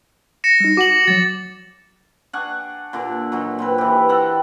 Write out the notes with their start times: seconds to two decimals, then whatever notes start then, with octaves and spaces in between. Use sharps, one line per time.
0.44 A#6 C#7 E7
0.60 G3 D#4
0.77 F#4 F#5 D6 F#7
1.07 F3 F#3 A6
2.33 D4 F#5 G#5 C#6
2.93 A#2 D3 D5
3.32 A#2 F#3 D#4
3.59 A#2 C4 B4
3.78 E3 G4
4.09 A4 F#5 G5 A#5